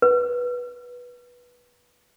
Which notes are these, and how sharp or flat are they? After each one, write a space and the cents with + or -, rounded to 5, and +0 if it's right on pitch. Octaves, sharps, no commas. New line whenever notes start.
B4 -15